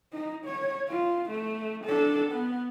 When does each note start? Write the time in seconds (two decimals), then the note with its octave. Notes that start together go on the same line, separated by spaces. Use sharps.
0.13 D#4
0.46 C#5
0.88 F4
1.30 A3
1.85 D4 A4
2.32 B3